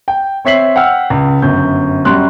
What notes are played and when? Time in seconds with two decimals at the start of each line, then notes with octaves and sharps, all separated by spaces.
0.08 G5
0.45 C4 C#5 E5 B6 C7 F#7
0.76 F#5 G5 E6 F6
1.10 C#2
1.42 G1 F#2 G6
2.05 F#2 G3 C6 F#6